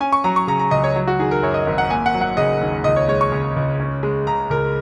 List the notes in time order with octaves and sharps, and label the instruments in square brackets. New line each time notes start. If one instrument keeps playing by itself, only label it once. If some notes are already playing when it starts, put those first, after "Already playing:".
[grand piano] C#4 G#5
C#6
F#3 A#5
C#6
C#3 A#5
A#5
C#2 D#5
C#5
F#3
F#4
D#3 G#4
A#4
F#2 C#5
D#5
G#1
F#5
A#3 G#5
F#5
F#3
F#5
C#3 D#5
D#2
C#2 D#5
C#5
G#3 C#5
C#6
C#3
C#2
C#4
G#3
C#3 A#5
C#2 A#4